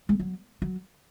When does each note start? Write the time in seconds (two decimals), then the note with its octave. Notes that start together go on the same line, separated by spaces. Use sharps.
0.09 G#3
0.19 F#3
0.62 F#3